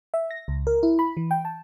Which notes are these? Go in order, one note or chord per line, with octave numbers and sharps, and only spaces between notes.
E5
A#6
C#2
A#4
E4
B5
E3
G5
A5